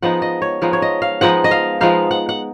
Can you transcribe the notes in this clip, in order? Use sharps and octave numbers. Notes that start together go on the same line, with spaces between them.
F3 G#3 B3 D#4 F#5
D#5
C#5
F3 G#3 B3 D#4 F5
C#5
D#5
F5
F3 G#3 B3 D#4 F#5
D#5
F5
F3 G#3 B3 D#4 F5
F#5
F#5